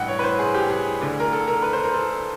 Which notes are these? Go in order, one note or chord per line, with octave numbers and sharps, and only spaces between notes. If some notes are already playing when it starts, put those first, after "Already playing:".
Already playing: A1 G2 E3 F#5 G5
C#5
B4
C5
G#4
G4
G#4
D2 D3
A#4
A4
A#4
B4
C5
A#4
A4